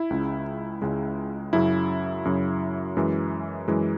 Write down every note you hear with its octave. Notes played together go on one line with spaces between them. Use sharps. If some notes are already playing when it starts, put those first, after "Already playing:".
Already playing: E4
C#2 C#3 G#3
C#2 C#3 G#3
F#2 C#3 F#3 E4
F#2 C#3 F#3
F#2 E3 G#3
F#2 E3 G#3